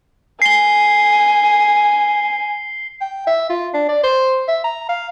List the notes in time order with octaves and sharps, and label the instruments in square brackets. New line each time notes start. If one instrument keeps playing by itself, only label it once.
[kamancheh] G#5 [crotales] C7 G7
[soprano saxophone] G5
E5
F4
D4
D5
C5
E5
A#5
F5